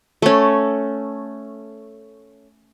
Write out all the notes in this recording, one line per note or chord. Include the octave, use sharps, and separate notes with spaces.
A3 C#4